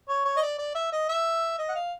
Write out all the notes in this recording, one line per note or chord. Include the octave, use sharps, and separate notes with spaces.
C#5
C#5
D#5
D5
D5
E5
D#5
E5
D#5
F#5
F5